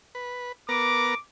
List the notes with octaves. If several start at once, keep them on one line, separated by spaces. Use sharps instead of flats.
B4
B3 A#4 A#5 D6